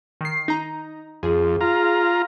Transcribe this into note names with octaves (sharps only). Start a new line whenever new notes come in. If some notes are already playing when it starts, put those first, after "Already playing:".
D#3 C7
D#4 A#5
F2 G#4
F4 A#5